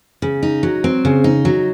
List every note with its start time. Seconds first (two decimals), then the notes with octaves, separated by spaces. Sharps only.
0.22 C#3
0.43 D#4
0.63 F#3
0.84 C4
1.05 C#3
1.24 D#4
1.45 F#3